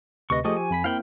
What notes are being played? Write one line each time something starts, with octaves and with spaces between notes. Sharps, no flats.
D2 C3 B4 D#5 C#6
F3 A3 G4 G#4 D#5 C#6
G#5
F2 B5 B6
A#3 C4 E4 F5 G5 B5